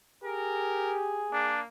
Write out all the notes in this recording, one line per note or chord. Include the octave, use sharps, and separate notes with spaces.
G4 G#4 A#4
A#3 D4